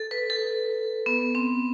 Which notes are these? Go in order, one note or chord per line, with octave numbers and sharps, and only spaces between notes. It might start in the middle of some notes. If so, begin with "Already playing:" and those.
Already playing: A4
B4
A4
B3
C4